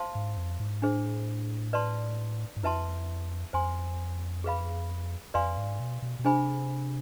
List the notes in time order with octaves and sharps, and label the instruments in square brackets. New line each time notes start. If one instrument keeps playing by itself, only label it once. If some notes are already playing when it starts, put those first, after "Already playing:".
Already playing: [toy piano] C5 F5 A5 C6
[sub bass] G#2
F2
G#2
[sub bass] A2 [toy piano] D4 G#4 C5
[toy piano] B4 D5 A5 C6
[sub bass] G#2
[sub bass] F2 [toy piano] E4 B4 E5 A5 C6
[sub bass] F2 [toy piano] C5 G#5 C6
[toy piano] G#4 B4 F5 B5
[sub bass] F2 [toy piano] B4 D5 F5 G#5 C6
[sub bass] G#2
B2
B2
B2
[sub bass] C3 [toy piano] D4 G#4 C5 G#5 B5